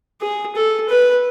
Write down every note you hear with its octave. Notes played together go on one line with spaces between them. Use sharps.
G#4
A4
B4